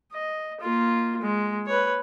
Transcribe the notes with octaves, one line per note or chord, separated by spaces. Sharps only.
D#5
A#3 F4
G#3
B4 C#5